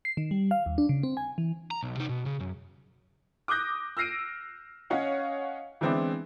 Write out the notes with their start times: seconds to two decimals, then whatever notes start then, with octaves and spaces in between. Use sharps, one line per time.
0.05 C7
0.17 D#3
0.31 G3
0.51 F5
0.66 D#2
0.78 D4
0.89 C#3
1.03 C4
1.17 G#5
1.38 E3
1.71 A#5
1.83 B1
1.97 C3 D#4
2.09 B2
2.26 C#3
2.40 F#2
3.48 D6 D#6 F#6 G6 A#6
3.97 E6 F6 A#6 C7 D7 D#7
4.90 C#4 C#5 D#5 F5 F#5
5.81 E3 G#3 B3 C4 D4 E4